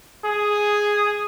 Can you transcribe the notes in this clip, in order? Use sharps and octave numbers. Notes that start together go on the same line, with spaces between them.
G#4